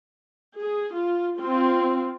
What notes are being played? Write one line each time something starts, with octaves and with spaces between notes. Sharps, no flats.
G#4
F4
C4 F4